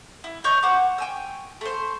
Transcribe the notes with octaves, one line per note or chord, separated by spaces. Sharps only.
E4
C#5 D#5 C#6 G6
C5 F#5 D6
G5 G#5 E6
A3 C5